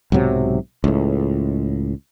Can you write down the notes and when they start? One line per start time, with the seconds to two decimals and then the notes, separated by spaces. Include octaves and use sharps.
0.12 B1 G#2 C3 F#3
0.84 C#2 A2